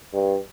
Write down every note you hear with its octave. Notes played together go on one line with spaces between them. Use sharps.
G2